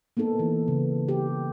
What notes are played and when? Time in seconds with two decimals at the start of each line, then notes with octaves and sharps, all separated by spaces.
0.17 A#3 B3 D#4 A4
0.39 E3
0.68 C#3
1.09 G4